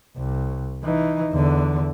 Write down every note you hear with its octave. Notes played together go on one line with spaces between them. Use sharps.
C2
E3 D#4
E2 D3